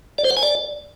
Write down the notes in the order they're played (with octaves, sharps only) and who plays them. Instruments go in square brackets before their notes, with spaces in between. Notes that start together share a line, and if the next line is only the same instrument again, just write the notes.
[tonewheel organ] D5
C5
F#5
G#5
D5